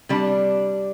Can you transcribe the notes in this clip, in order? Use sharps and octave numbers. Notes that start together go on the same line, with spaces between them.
C3 G3 D4